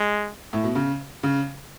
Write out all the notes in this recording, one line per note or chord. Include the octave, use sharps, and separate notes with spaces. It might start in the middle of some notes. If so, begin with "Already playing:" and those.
Already playing: G#3
A2
B2
C#3
C#3